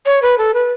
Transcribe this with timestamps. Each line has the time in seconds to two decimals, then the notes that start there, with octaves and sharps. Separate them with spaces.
0.06 C#5
0.22 B4
0.38 A4
0.54 B4